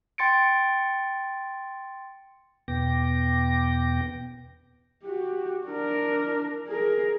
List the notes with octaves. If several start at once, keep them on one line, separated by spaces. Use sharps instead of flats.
G5 C6 A6 C#7 D7
E2 B2 B3 G5 D6 A#6
F#4 G4
D4 A#4
G#4 A#4